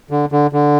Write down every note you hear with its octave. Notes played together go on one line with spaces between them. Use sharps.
D3
D3
D3